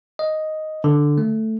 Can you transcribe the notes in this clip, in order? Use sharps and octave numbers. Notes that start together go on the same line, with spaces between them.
D#5
D3
A3